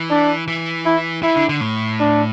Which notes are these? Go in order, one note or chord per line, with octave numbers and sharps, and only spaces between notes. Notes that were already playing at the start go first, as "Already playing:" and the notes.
Already playing: E3
D4
E3
E4
E3 E4
D3
D3
A2
D4